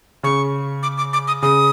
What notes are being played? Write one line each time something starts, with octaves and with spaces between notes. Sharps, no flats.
C#3 C#6
D6
D6
D6
D#6
C#3 D#6